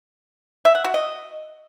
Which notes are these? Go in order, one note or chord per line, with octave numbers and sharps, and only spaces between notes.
E5
F#5
F#4
D#5